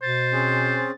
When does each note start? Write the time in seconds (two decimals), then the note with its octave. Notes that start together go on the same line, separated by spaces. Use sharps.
0.02 B2 C5 A6
0.33 C4 C#4 G#4